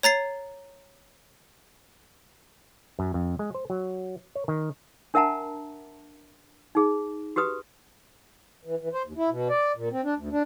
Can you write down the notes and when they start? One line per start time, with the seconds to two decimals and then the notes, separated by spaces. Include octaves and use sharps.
0.03 C#5 A#5 A6 C7
2.99 F#2
3.14 F2
3.39 G#3
3.54 C5
3.70 F#3
4.35 C#5
4.48 D#3
5.14 D4 A#4 E5 F#5 A5 A#5
6.75 D#4 G#4
7.36 F#4 G4 B4 D#6
8.65 E3
8.81 E3
8.94 C5
9.06 D#2
9.17 E4
9.29 B2
9.50 D5
9.76 A#2
9.91 C4
10.04 D4
10.17 D2
10.32 D4